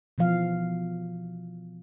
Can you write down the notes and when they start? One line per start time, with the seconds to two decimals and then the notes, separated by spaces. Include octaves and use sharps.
0.18 B2 E3 F3 F5